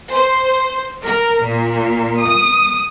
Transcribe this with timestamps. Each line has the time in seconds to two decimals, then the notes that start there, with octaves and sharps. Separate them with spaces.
0.13 C5
1.03 A#4
1.44 A#2
2.20 D#6